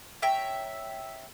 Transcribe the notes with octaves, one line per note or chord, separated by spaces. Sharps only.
C#5 E5 G5 A#5